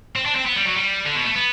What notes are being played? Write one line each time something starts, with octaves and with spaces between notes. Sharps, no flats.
C4
D4
C4
B3
G3
F#3
G3
D3
B2
A3
B3